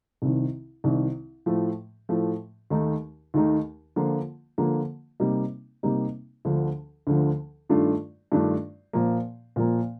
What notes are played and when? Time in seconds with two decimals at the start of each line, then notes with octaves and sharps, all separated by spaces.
0.22 C2 C3 D#3
0.84 C2 C3 D#3
1.46 A2 F3 A3
2.09 A2 F3 A3
2.70 D#2 D#3 A3 D#4
3.34 D#2 D#3 A3 D#4
3.96 D3 F3 A#3 F4
4.58 D3 F3 A#3 F4
5.20 C3 G3 A#3 D#4
5.83 C3 G3 A#3 D#4
6.45 D2 D3 F3
7.07 D2 D3 F3
7.69 G2 D#3 A3 D4 F4
8.32 G2 D#3 A3 D4 F4
8.93 A#2 F3 A#3
9.56 A#2 F3 A#3